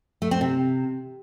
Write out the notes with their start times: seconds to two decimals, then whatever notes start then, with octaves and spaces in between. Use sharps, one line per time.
0.22 A3
0.31 C4
0.41 C3